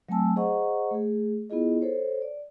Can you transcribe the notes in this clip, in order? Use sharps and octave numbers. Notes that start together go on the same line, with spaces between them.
F#3 A3 C4 G#5 A5 E6
G#4 C5 D#5 F#5 A#5 C#6
A3 G#4
B3 E4 F4 G#4 D#5
A4 C5 C#5
D5